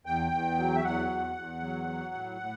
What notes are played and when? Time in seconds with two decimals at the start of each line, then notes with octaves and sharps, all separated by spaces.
0.06 E2 G5
0.32 E2
0.58 F#3
0.75 E5
0.84 E2 F#5
1.10 E2
1.36 E2
1.62 F#3
1.88 F#3
2.14 A2
2.41 A2